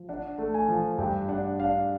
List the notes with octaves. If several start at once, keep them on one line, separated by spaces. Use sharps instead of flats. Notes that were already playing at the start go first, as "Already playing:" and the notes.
Already playing: F3
D4 F#5
A3
G#5
F3
G2 G5
D4 F#5
D4 F5